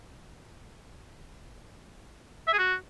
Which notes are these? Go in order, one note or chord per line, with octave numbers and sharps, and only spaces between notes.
E5
G#4
F#4